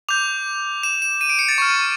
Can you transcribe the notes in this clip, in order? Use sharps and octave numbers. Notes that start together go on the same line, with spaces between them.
D6 G6 F7
E7
E7
D#7
D7
C#7
A6
C#6 F6